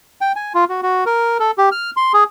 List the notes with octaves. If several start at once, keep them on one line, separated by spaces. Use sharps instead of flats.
G5
G#5
F4
F#4
F#4
A#4
A4
G4
F6
C6
G#4